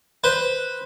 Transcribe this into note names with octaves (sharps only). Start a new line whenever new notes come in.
B4 C5